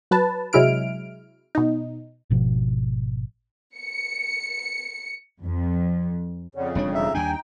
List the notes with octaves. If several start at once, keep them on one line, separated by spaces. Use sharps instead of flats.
F#3 B4 A5
C3 F#3 G#3 E4 F6 D7
B2 D#4
G#1 B2 F3
C#7
F2
F2 C#3 C#5 D5 F#5
E1 G3 D4 C#5
D#4 E5 A#5
D#2 G3 D4 G5 G#5